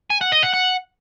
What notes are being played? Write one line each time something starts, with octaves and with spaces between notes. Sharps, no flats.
G#5
F#5
D#5
F#5
F#5